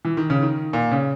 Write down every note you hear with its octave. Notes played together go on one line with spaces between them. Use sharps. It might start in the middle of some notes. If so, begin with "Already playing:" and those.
E3
D#3
C#3
D#3
A#2
C#3